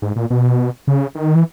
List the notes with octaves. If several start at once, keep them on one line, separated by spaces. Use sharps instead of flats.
G#2
A#2
B2
C#3
D#3
E3